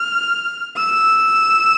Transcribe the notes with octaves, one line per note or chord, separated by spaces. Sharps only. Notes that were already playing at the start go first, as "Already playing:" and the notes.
Already playing: F6
E6